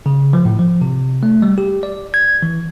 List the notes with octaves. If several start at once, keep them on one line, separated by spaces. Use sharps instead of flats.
C#3
F3
A2
F3
C3
A3
G3
G4
D5
G#6
E3